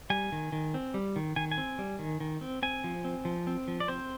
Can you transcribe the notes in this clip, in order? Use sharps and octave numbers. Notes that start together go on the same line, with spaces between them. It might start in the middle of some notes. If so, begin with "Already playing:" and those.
G3 G#5
D#3
D#3
C4
G3
D#3
D#3 G#5
G#5
C4
G3
D#3
D#3
C4
C4 G#5
F3
C4
F3
C4
F3
D5
C4 C5